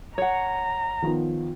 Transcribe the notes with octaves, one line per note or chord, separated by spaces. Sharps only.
C#5 F#5 A#5
D#3 F3 B3